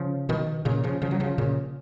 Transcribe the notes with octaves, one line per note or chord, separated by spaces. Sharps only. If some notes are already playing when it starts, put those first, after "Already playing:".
Already playing: C#3 F3
B2 D#3
A#2 C#3
C#3 F3
C#3 F3
F#3
C#3 F3
A#2 C#3